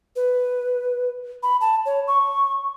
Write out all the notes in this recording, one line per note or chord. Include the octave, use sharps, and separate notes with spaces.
B4
B5
A5
C#5
C#6